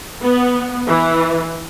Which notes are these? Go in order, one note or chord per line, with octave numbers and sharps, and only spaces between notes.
B3
E3